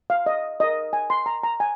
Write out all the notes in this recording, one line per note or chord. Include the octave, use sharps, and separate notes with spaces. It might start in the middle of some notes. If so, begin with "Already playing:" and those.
F5
D#5
D#4 A#4 D#5
G#5
C6
A#5
A#5
G#5